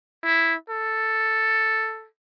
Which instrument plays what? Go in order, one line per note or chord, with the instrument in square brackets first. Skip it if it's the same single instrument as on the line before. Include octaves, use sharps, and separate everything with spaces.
[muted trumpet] E4
A4